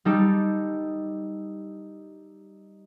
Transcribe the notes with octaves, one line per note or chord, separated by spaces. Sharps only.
G3 D#4 G4 A4